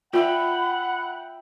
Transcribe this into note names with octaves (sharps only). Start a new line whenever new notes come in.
F4 E5 F#5 G5 B5